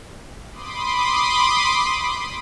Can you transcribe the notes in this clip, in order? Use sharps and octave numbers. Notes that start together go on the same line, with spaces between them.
B5 C6 D6 D#6